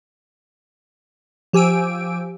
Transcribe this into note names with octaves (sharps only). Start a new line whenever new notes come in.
F3 G4 G#5 E6 D7